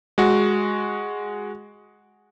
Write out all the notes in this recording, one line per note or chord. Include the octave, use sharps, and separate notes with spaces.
G#3 F#4